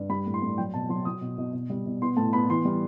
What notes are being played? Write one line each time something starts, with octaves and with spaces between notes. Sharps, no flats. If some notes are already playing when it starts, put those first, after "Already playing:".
Already playing: G2
G3 B5
A2
C6
A2
F#3 G5
B2 A5
F#3 C6
F#3 D#6
B2
B2
B2
G3
B2
B3 C6
A2 A5
B3 B5
E3 C6
G3